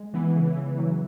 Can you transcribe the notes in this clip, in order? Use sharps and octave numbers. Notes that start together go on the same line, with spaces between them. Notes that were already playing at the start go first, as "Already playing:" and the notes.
Already playing: G#3
E3 B3
C#3
C#3
F#3